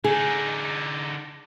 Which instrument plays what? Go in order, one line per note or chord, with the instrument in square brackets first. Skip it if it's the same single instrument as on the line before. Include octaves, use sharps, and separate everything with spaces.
[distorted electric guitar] D3 D#4 [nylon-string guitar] G#4